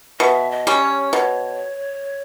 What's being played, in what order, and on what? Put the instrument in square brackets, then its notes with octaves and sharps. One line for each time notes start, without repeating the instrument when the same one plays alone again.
[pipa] B2 [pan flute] E5
[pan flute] D#5
[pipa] G3 C#4
[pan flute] C#5
[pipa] B2 [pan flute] C#5